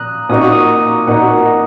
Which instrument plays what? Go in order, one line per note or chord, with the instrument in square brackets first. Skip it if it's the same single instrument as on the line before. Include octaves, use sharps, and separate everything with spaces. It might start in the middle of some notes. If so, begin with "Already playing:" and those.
Already playing: [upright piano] A#2 [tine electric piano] A#5 D#6 F#6
[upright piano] A#2 A#3 D#4 F#4 [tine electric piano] D#6
[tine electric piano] C#6
D#6
A#5
[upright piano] A#2 A#3 D#4 F#4 [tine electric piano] F#5
[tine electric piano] D#5